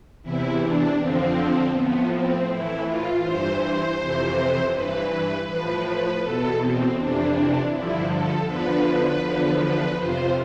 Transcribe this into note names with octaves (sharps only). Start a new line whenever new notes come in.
E2 C3 E3 E4
D4
F2 D3 F3 C4
A2 F3 B3
C4
A2 E3 E4
F4
G2 E3 C5
C5
F2 C3 E3
G2 E3 B4
A2 F3 B4
B4
E2 B2 A4
C4
F2 C3 E3 D4
G2 D3 F3 E4
A4
E2 D3 F3 B4
B4
E2 D3 F3
B4
F2 C3 F3 C5